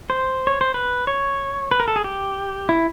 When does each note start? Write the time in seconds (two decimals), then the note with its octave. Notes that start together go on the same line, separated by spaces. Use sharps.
0.10 C5
0.47 C#5
0.61 C5
0.74 B4
1.07 C#5
1.71 B4
1.80 A#4
1.88 A4
1.96 G#4
2.04 G4
2.69 E4